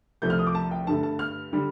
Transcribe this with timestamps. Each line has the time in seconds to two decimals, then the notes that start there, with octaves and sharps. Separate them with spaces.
0.22 C2 C3 F3 A3 G6
0.30 F6
0.39 D#6
0.47 D6
0.55 A5
0.71 G5
0.87 G2 D3 A3 A5
1.03 A5
1.19 F6
1.53 D3 G3